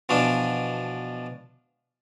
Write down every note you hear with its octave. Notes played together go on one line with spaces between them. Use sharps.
B2 E3 F3 D4